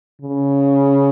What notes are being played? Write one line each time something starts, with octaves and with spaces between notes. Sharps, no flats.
C#3